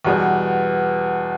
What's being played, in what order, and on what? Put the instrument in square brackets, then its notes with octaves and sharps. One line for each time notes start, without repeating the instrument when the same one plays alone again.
[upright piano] E2 B2 G3